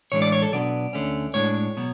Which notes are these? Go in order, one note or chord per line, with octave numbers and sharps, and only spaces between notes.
A2 E3 G#3 D4 C#5
D5
C#5
A4
B2 F#3 B3 D4 D5
D2 D3 A3 C#4
A2 G#3 D4 C#5
B2 F#3